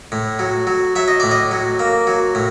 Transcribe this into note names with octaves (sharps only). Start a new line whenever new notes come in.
A2
F#3
F#3
F#3 E5
D#5
A2 D5
D#5
F#3
A#3
F#3
A2